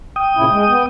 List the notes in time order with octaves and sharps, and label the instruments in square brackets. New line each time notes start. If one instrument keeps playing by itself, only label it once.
[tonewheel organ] G5 D#6
[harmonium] A#2 C#3 E4
G#3
B3